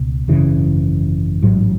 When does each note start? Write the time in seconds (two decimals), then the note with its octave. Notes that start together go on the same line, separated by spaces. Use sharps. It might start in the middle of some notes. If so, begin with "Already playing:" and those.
Already playing: C#2 B2
0.28 G#1 F#2 C#3 E3
1.42 A1 G#2 F#3